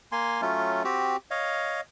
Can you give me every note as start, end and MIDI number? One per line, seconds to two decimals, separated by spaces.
0.12 0.41 58
0.12 0.41 80
0.12 0.41 84
0.42 0.83 54
0.42 0.83 57
0.42 0.83 61
0.42 0.83 65
0.84 1.17 60
0.84 1.17 66
0.84 1.17 67
1.31 1.81 73
1.31 1.81 75
1.31 1.81 77